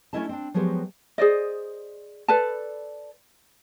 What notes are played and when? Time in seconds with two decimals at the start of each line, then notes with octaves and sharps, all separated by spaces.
0.13 A3 C#4 D4 E4 D#5 A5
0.29 C4 D4
0.54 F3 F#3 G#3 B3 F#4 G4
1.18 G#4 C5 D5 D#5
2.28 A4 B4 D5 A5